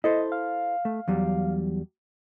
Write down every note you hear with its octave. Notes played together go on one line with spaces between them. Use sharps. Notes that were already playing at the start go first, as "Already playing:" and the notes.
E4 A4 C5 D#5
F5
A3
E2 F#3 G3